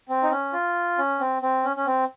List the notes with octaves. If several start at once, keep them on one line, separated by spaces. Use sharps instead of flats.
C4
D#4
C#4
F4
C#4
C4
C4
C#4
C#4
C4